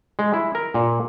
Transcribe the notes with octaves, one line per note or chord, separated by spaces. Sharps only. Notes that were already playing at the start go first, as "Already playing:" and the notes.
G#3
E4
A#4
A#2